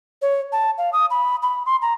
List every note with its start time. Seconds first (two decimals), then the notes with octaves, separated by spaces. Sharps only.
0.22 C#5
0.52 A5
0.78 F5
0.93 D#6
1.10 B5
1.42 B5
1.66 C6
1.82 A#5